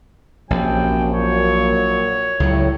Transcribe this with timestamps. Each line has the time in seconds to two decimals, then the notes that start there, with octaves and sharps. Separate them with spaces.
0.50 A#1 C3 F#3 C#4 G5
1.13 A#2 F#3 C#5
2.40 C#2 A2 F#3 G3 A3